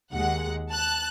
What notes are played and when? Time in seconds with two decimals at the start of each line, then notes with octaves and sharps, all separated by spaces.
0.13 D#2 G#3 F#5
0.71 A5 F#6